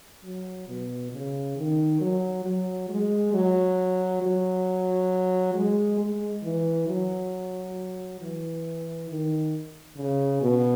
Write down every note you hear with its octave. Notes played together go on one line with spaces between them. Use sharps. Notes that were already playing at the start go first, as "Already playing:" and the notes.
F#3
B2
C#3
D#3
F#3
F#3
G#3
F#3
F#3
G#3
G#3
E3
F#3
E3
D#3
C#3
B2